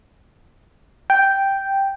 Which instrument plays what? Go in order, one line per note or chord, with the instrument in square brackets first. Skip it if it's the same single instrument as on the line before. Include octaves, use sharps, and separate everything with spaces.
[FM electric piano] G5